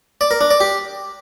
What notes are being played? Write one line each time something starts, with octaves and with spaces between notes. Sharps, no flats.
D5
A#4
D4
D5
G4